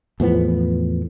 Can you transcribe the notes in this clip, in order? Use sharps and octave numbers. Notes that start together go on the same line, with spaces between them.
E2 A2 F3 B3